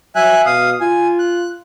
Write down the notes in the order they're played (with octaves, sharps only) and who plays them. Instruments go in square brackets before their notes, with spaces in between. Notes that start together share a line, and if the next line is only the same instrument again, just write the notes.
[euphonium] F#3 [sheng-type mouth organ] E5 G#5 F#6
[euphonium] B2 [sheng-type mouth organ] F5 D#6
[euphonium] F4 [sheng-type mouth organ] G#5
[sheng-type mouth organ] F#6